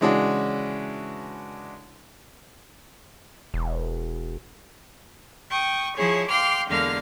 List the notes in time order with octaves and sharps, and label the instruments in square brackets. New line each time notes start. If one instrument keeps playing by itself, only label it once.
[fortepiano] C#3 E3 G#3 C#4 D4 F#4
[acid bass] E1
[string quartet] G5 C#6 D#6
F3 E4 G#4 C#5
F5 G5 C6 D6 F6
E2 D3 G#3 A#3 F5 F6